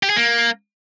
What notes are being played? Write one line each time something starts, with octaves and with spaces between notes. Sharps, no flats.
G4
G#4
A#3